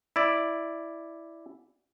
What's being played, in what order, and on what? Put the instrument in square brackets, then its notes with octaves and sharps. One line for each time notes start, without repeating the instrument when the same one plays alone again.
[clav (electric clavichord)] E4 D5